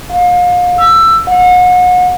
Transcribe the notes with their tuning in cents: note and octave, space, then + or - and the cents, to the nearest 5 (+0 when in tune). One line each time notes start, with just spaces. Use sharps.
F5 +35
E6 +15
F#5 -35